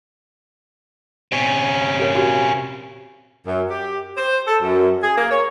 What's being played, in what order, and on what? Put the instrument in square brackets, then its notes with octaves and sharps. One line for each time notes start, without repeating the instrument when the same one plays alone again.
[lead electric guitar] C3 C#4 [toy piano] D5
[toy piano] G4 A#4 C#5
F#4 G4
[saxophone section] F#2
G4
C5
A4
F#2
G#4
A#3
C#5